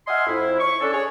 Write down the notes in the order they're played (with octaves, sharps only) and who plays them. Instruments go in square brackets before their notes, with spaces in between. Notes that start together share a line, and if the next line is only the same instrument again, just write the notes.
[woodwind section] D#5 E5 F#5 G#5 C6 F6
F2 E4
C#6
C#4 D4 A4
G#4 C#5